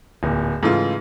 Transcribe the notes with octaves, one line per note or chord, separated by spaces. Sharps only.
D1 A#2
G#2 C#3 E3 A3 F4